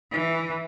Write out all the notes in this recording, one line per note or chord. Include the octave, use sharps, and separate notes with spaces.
E3